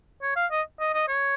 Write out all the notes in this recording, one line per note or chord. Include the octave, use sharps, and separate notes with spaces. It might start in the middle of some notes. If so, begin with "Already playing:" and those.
C#5
F5
D#5
D#5
D#5
C#5